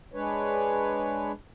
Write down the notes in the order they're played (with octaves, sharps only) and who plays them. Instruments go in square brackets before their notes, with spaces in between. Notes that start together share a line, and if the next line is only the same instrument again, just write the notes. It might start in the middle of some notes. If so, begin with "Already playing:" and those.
[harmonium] G#3 D4 B4 C#5